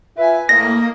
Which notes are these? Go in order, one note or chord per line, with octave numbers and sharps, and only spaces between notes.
F4 B4 E5 G#5
A2 A#3 D#5 A#6